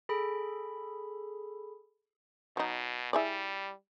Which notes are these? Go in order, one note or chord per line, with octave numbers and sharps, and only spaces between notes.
G#4 A4 B5
B2 F#3 D#4
G3 E4 G#4 D5